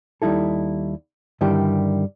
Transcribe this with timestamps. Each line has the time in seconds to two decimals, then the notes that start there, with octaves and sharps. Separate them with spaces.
0.22 D#2 G3 D#4 E4 A4
1.41 G2 D3 D#3 G3 E4 G4